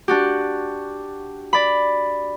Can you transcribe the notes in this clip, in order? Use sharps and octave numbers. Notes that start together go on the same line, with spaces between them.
D4 F#4 G4
D5 B5